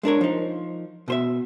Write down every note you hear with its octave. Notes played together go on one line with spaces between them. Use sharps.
G#3 D4 A#4 C#5
F3 D#4
B2 C5 E5